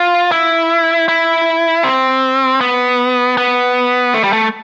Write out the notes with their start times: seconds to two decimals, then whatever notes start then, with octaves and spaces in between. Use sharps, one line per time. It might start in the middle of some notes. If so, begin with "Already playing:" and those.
Already playing: F4
0.32 E4
1.08 E4
1.84 C4
2.61 B3
3.37 B3
4.14 A3
4.24 G3
4.33 A3